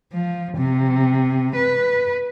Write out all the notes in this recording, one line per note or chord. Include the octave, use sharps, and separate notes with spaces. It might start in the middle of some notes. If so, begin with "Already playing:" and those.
F3
C3
B4